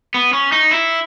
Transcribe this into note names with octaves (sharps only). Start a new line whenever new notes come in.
B3
C#4
D#4
E4